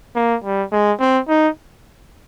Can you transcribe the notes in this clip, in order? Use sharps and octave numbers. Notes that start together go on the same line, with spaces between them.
A#3
G3
G#3
C4
D#4